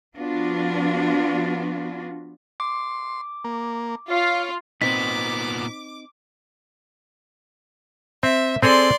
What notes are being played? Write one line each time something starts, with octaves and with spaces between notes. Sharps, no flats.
F3 B3 D4 F4 F#4
C6 D6
A#3
F4 C#5 F5
A#2 B3 C4 D#4 D6 B6
C4 E5
C4 G#4 A4 D5 C6